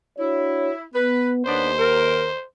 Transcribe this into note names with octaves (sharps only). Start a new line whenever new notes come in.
D4 E4 F#4 C#5
B3 B4
D#2 B3 C#4 D4 C5
A#4